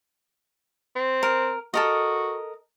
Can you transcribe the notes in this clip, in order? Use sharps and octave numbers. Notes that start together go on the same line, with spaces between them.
C4
A#4
F#4 A4 A#4 D#5